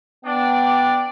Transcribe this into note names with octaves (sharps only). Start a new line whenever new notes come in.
B3 D4 D5 G5